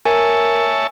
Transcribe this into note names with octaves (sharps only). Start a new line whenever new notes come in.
A#4 C#5 E5 G#5 A5